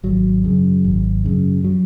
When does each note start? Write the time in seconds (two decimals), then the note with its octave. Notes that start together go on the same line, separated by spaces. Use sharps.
0.03 G#1 F#3
0.44 F#2 C#3
0.84 G#1
1.24 F#2 C#3
1.64 F#3